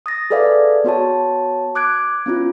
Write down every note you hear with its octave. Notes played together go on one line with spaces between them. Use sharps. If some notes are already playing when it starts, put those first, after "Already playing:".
D#6 A6 A#6
G#4 A4 B4 D5 E5 F5
B3 F#4 C#5 A5
D6 F#6 G#6 D7
B3 C#4 E4 F4